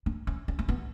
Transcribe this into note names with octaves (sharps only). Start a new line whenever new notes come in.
D4
C#4
C#4
C#4
B3